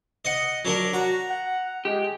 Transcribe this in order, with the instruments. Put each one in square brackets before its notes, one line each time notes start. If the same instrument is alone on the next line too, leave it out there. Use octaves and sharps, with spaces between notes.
[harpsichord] D#5 F#5
F#3 D4 A#4
[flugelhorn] F#4 [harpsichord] A#5
[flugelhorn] F#5
[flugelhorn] G#3 [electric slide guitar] G4